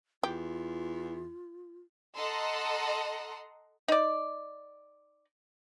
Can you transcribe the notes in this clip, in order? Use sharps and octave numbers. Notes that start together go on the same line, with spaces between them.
E2 F4 G4
A4 D#5 F#5 A#5 C6
D#4 D5